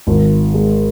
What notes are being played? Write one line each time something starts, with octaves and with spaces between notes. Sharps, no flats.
G#1
G#3